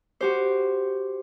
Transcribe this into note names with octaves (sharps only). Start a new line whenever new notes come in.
F#4 G4 C5